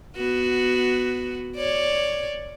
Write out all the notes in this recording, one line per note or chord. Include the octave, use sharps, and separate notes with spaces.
B3 F#4
C#5 D5